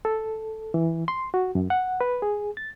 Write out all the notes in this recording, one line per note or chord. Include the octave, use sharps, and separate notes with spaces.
A4
E3
C6
F#4
F#2
F#5
B4
G#4
A6